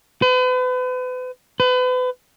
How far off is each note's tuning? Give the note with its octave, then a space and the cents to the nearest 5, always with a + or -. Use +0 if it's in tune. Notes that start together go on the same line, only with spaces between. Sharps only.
B4 +40
B4 +35